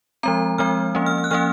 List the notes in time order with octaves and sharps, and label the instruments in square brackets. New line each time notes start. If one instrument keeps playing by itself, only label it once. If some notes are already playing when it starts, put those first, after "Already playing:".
[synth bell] F3 G#3 C4 A#5
F3 G#3 C4 F6
F3 A#3 C#4
F6
F6
F#6
F3 A#3 C#4 F6